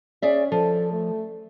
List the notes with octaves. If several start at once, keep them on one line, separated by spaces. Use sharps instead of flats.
C#4 G#4 D5 E5
F3 A4
A3